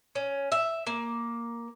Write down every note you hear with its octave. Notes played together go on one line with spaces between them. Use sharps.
C#4
E5
A#3